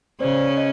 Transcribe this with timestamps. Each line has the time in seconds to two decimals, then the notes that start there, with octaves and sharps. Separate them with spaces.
0.20 C#3 C#4 C5 D5
0.57 D#5